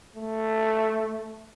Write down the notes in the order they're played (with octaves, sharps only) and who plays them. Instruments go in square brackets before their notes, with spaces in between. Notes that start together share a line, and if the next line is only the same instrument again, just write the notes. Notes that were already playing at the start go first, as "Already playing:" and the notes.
[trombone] A3